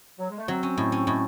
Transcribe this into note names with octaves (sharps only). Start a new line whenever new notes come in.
F#3
G#3
A3
F#3 C4
C#4
A2
C#4
A2